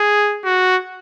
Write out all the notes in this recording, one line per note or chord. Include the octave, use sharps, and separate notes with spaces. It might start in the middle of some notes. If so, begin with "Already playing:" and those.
Already playing: G#4
F#4